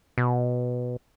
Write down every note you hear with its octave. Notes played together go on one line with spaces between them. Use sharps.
B2